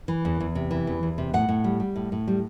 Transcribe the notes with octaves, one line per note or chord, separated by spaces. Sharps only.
E3
E2
E2
C3
E3
E2
E2
C3
A2 F#5
A2
G3
G3
A2
A2
G3